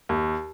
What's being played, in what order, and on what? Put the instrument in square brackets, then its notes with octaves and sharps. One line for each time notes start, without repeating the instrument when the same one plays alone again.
[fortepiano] D#2